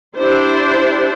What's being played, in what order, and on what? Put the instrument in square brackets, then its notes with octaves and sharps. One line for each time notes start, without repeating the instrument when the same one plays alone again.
[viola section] D4 E4 G4 C5